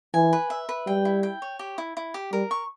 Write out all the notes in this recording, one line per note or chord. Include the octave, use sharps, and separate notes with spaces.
E3 G#5
B4
E5
B4
G3 G5
E4
G5
C#5
G4
E4
E4
G4
G3 A#4
C#6